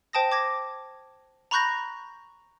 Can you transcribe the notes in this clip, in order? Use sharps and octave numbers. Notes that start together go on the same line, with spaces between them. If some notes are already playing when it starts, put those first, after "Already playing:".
C5 G5 A5 D#6 A#6
D6 G#6 A#6
A#5 B5 C#6 F#6 G6 A#6